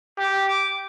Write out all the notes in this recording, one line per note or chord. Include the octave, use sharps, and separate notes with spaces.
G4 D6
D6